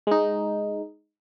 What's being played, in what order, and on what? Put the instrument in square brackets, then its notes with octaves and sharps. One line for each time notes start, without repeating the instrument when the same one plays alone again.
[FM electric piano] G#3 D#4